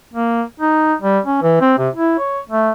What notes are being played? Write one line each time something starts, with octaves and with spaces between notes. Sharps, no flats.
A#3
D#4
G3
C#4
E3
C4
C3
E4
C#5
A3